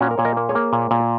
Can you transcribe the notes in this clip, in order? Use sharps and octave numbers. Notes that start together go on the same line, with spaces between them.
A#2 C#4 F#4
A#4
A#2 C#5
A#4 D#5
A#3
G#4 C#5
A#3
A#2
A#2